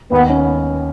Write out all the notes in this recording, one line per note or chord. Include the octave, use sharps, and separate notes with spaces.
D#2 B3
C#4